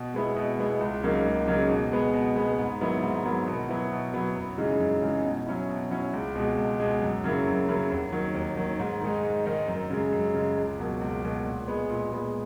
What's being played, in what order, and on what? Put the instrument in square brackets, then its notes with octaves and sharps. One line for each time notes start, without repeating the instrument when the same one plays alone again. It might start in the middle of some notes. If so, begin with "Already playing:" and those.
Already playing: [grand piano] B2
G#3 B3 E4
B2
G#3 B3 E4
C#2
C#3 F#3 A#3 D#4
C#2
C#3 F#3 A#3 D#4
B2
G#3 B3
B2
G#3 B3
G#2
D#3 F#3 B3 E4
G#2
D#3 F#3 B3 E4
B2
F#3 B3 E4
B2
F#3 B3 E4
F#2
C#3 E3 G#3 D#4
F#2
C#3 E3 G#3 D#4
B2
F#3 C#4 E4
B2
F#3 C#4 E4
C#2
B2 G#3
C#2
B2 G#3
F#2
C#3 F#3 A#3 E4
F#2
C#3 F#3 A#3 E4
D#2
D#3 F#3
D#2
D#3 F#3
G#2
D#3 G#3 D#4
G#2
D#3 G#3 D#4
F#2
C#3 G#3
F#2
C#3 G#3
C#2
B2 F#3 A#3
C#2
B2 F#3 A#3
A#2
G#3 B3
A#2
G#3 B3